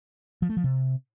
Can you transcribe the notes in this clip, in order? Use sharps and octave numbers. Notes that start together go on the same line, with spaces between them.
F3
A3
F3
C3